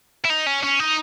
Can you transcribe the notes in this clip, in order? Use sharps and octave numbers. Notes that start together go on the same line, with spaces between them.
E4
D#4
C#4
C#4
D#4